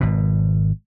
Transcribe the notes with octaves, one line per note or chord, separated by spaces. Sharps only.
G#1 B2